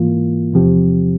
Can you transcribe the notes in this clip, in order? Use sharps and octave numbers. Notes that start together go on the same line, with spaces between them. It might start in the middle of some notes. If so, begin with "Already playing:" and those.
Already playing: G#2 E3 A#3 F4
E2 C3 F3 C4 G4